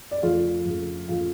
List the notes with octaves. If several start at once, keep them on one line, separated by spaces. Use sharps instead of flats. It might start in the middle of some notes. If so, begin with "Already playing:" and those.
D5
F2 C#3 F3 A3 F4 F5
F2 C#3 F3 A3
F2 C#3 F3 A3 F4 F5